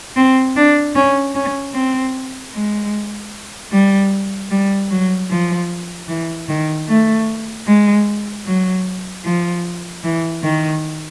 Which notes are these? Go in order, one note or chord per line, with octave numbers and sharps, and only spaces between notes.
C4
D4
C#4
C#4
C4
G#3
G3
G3
F#3
F3
E3
D#3
A3
G#3
F#3
F3
E3
D#3